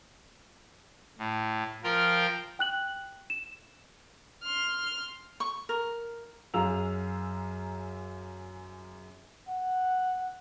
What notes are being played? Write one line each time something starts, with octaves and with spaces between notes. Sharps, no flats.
A2
F3 F4 A#4 G5
G5 F#6 F#7
E7
C6 F6
C#6
A#4
F#2 G#4 F5 A#5 E6 F7
F#5